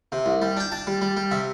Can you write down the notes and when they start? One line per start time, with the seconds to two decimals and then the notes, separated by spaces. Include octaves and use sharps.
0.12 C3
0.26 C2
0.42 G3
0.57 D4 G5
0.72 D4 A5
0.87 G3
1.01 G3
1.17 G3
1.31 C3 E5